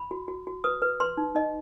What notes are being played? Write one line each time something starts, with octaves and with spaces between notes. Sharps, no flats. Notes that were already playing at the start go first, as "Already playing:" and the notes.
Already playing: B5
F#4
F#4
F#4
B4 D#6
B4
B4 C6
D#4
D#4 D#5